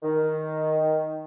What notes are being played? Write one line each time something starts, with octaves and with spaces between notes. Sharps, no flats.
D#3